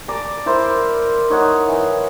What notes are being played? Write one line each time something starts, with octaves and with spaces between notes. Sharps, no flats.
D5 A5 A#5
E4 A#4 C5
D#4 C#5 F#5
E3